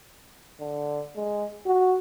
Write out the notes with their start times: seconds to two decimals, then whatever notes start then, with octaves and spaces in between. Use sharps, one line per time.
0.60 D3
1.16 G#3
1.66 F#4